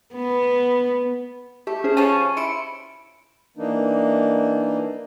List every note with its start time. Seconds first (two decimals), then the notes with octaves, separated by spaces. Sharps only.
0.15 B3
1.67 A3 G4
1.84 C#4 G#4 C5
1.97 F3 C#4 D#7
2.37 E4 C6 C#7 D7
3.57 E3 A#3 D4 D#4